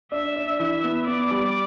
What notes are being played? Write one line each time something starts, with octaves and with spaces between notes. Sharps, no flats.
D4 E5
D4
E3 E5
B3
B3 D5
G3